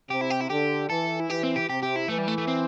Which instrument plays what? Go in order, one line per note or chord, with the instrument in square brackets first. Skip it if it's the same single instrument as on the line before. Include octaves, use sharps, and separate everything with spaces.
[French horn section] C3 [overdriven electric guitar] G4
[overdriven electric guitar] E4
G4
E4
[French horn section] D3 [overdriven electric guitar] G4
[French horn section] E3 [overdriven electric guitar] A4
[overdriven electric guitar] E4
[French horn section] E3 [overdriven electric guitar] G4
[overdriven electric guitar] C4
G4
[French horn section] C3 [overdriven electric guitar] G4
[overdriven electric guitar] G4
E4
[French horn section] E3 [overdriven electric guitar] A3
[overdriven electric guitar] G3
A3
A3
C4